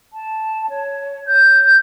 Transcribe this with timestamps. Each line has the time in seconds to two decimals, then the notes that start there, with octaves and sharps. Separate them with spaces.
0.13 A5
0.70 C#5
1.28 G6